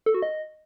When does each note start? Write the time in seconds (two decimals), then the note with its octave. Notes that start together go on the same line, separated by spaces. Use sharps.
0.06 A4
0.14 F#4
0.22 D#5